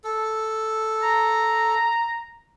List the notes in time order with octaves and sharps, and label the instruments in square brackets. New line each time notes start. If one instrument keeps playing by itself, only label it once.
[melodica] A4
[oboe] A#5